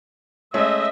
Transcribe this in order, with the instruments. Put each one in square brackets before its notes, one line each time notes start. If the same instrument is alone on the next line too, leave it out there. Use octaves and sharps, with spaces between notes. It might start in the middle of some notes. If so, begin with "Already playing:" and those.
[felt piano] G#3 A3 C#4 [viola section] D#5 E5